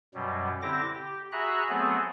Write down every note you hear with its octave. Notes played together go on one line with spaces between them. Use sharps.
F#2 B2 F#3 G3
D3 C4 E4 G4 D6 A#6
G4
F#4 G#4 E5 A#5 B5 F#6
F#3 A3 B3 C4 G#4 A4